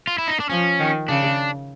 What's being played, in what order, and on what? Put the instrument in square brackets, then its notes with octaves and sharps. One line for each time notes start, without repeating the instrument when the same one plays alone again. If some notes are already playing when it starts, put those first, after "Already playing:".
[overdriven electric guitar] F4
E4
D#4
D4
[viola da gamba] F3 [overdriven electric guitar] C#4
[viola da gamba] D#3
[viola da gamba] C#3 [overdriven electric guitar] D4